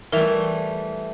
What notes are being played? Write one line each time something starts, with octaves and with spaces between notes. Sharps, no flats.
E3 G3 A3 A#4 E5 F7